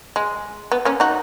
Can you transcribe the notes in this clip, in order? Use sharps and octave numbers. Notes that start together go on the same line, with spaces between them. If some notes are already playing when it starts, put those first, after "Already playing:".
G#3
B3
A#3 C#4
D#4 F#4